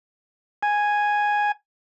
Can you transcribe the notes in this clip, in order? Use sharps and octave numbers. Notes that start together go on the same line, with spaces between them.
G#5